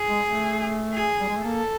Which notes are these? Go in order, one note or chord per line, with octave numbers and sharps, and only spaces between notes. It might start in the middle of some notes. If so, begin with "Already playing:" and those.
Already playing: G#4
G#3
A3
G#4
G3
G#3
A3
A#3 A4